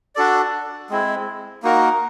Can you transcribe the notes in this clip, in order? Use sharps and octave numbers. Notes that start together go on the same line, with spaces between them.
D4 F#4 A4 D5
G#3 C4 E4
A#3 D#4 F#4 A#4